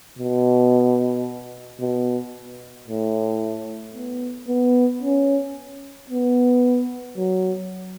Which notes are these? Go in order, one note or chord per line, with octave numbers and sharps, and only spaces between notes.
B2
B2
A2
B3
B3
C#4
B3
F#3